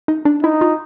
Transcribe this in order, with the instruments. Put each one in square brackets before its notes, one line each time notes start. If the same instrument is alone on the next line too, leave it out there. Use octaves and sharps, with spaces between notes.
[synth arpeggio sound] D#4
D4
[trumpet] D#4 [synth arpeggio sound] E4
[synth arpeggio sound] F4